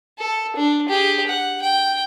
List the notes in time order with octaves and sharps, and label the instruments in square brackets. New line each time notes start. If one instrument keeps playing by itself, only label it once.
[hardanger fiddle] A4
D4
G4 G#4
F#5
G5